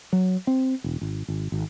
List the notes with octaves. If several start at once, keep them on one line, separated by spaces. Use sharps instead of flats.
F#3
C4
E1
G#1
G#1
G#1